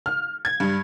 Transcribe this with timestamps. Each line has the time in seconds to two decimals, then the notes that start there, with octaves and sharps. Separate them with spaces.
0.06 F6
0.45 G#6
0.60 G2